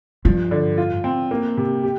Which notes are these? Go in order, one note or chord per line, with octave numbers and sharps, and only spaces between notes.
G2 F3
D3
F4
C4
A#3
C3
G4